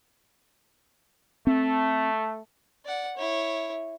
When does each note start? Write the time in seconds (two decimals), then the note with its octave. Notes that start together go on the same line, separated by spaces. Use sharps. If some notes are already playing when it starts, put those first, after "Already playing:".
1.47 A3 C4
2.85 D5 F#5
3.17 E4 C#5